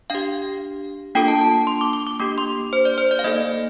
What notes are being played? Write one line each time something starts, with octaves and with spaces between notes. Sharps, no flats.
D4 G4 F5
A#3 D4 F4 A4 G5
A5
A5
C6
D6
D6
D6
A#3 D4 G4 D6
C6
C5
D5
C5
D5
F5
A#3 D#4 A4 D#5